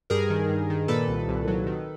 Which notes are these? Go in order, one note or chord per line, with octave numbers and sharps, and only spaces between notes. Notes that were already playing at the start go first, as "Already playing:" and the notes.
G2 G#4 A#4
D#3
G2
D#3
A#2 A4 B4
C2
C2
F#3
D#3